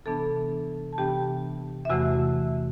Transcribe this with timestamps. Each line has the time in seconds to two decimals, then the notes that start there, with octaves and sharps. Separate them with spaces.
0.06 C3 E3 B3 D4 A4 A5
0.93 A5
0.98 C3 E3 B3 D4 G4 G5
1.85 E5
1.90 E2 C3 E3 A3 F#4 F#5